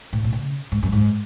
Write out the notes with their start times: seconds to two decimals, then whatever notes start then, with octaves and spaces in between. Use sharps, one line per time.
0.13 A2
0.24 B2
0.33 C#3
0.72 G#2
0.83 F#2
0.92 G#2